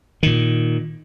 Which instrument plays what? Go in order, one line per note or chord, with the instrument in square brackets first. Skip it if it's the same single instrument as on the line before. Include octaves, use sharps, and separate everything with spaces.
[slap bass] A#2 D#3